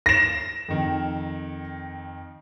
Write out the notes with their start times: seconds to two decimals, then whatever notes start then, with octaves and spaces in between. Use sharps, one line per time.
0.06 A#6 E7
0.68 F2 D#3